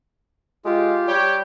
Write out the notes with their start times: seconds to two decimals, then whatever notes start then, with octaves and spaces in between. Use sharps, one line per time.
0.65 G#3 F4 G4
1.07 G3 G4 C#5 G5